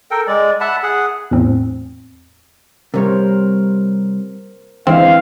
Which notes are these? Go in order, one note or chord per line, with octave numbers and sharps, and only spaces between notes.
A4 A#4 G5
G#3 D5
E5 F#5 A5 B5
G#4 F#5
E2 A2 C4
C3 G3 A#4 C5 C#5
D3 E3 G#3 C4 E4 F5